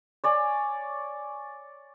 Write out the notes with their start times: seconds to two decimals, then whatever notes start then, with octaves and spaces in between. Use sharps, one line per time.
0.24 C#5 D5 G#5